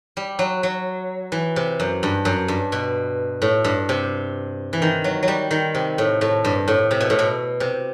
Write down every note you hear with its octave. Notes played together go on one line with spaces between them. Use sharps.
G3
F#3
F#3
E3
C3
F#2
G2
F#2
G2
B2
A2
G2
C3
E3
D#3
F#3
F#3
G3
D#3
C3
A2
A2
G2
A2
C3
B2
A2
B2
C3